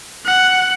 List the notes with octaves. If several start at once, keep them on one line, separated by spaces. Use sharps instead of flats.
F#5